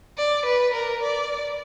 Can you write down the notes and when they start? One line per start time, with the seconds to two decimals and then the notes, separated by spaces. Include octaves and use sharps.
0.18 D5
0.46 B4
0.74 A#4
1.03 D5